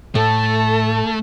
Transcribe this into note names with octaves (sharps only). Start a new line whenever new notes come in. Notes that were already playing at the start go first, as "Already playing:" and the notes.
A2 A3 A4 A5